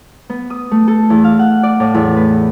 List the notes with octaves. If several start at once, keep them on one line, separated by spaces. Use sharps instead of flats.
B3
D#6
A3
A4
E2
F5
F#5
D5
A2
E2
B4